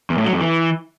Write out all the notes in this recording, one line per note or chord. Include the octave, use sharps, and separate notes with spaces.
E2
A2
F#3
F2
E3